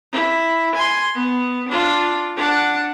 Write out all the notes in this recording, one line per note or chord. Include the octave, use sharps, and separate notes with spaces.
E4
G#5 C6
B3
D4 F4
D4 F#5